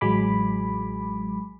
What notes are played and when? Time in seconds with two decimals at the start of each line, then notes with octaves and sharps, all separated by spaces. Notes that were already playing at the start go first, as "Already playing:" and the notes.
0.01 A1 F#3 G#3 G#5 B5 D6